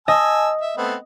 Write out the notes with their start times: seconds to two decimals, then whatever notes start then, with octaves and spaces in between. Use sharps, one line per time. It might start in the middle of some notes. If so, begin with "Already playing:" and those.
0.08 D#5 G#5 A5 E6
0.61 E5
0.77 A3 B3 C4